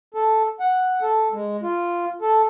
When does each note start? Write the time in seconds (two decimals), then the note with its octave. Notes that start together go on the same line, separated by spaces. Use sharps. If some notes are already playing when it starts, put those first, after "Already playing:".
0.14 A4
0.60 F#5
1.02 A4
1.33 G#3
1.62 F4
2.21 A4